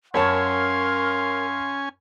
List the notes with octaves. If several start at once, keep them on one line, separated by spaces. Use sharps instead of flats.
F#2 C#4 A#4 C#5 F5 G#5 A5 C6